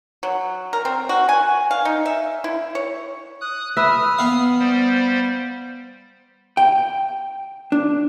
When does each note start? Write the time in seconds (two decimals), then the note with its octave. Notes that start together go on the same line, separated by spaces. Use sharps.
0.23 F#3
0.73 A#4
0.85 C4
1.09 F#4
1.29 G#5
1.71 F5
1.85 D#4
2.06 E5
2.44 E4
2.75 C#5
3.41 D#6 F#6
3.77 B4 E5 D#6 F6
4.19 B3 F5
4.59 G3 C5
6.57 G5
7.72 D4